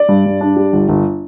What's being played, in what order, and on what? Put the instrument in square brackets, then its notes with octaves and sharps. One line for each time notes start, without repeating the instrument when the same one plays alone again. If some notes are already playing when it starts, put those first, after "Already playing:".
Already playing: [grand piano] D5
G2
G2
D4
G3
G1
G1